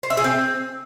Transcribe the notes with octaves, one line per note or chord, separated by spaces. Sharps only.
C5
E5
G#4
C4